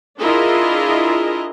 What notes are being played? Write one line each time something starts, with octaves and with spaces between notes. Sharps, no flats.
D4 E4 F4 G#4 A#4 D#5